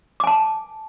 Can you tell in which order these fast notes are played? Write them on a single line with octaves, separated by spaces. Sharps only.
D6 G#5 A5